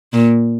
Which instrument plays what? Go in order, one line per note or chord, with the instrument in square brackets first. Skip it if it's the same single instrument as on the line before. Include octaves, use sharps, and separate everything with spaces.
[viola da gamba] A#2